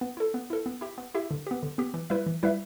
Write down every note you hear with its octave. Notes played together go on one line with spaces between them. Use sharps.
B3
E4 A4
B3
E4 A4
B3
E4 G4 E5
B3
E4 G4 E5
D3
B3 G4
D3
B3 G4
E3
G3 E4 B4 E5
E3
G3 E4 B4 E5